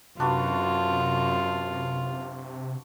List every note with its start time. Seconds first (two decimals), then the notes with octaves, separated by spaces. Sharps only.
0.20 F#2 C3 D4 F4 F#4 B4